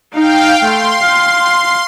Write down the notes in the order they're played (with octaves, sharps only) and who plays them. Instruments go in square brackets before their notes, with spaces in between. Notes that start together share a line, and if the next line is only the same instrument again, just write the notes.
[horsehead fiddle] D#4 [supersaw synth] F5 G5
[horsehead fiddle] A3 [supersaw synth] C6
[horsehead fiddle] F5